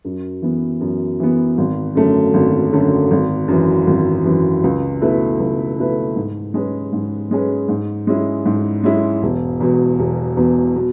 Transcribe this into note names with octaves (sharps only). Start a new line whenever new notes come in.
F#2
E3 B3
F#2
E3 B3
G#1
F#2 D3 A3 C#4
G#1
F#2 D3 A3 C#4
G#1
F#2 E3
G#1
F#2 E3
C#2
B2 A3 E4 B4
C#2
B2 A3 E4 B4
G#2
G#3 C#4 G#4 B4
G#2
G#3 C#4 G#4 B4
G#2
G#3 C#4 E4
G#2
G#3 C#4 E4
E1
E2 B2
E1
E2 B2
B2